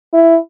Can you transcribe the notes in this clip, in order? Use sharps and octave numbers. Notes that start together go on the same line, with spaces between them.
E4